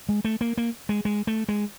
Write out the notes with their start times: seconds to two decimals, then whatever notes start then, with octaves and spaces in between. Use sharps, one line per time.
0.09 G#3
0.25 A3
0.41 A#3
0.57 A#3
0.89 G#3
1.05 G#3
1.27 A3
1.49 G#3